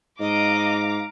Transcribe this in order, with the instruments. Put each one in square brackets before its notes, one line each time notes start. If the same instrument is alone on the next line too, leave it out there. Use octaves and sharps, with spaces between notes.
[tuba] G#2 [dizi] D#5 [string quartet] F5 A#5 D6